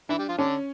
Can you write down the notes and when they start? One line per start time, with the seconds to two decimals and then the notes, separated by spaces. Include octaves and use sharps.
0.09 E3 D4 E4
0.18 G3 G4
0.29 F3 F4
0.38 D3 C#4 D4